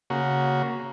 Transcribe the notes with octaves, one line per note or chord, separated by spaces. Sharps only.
C#3 A#3 F#4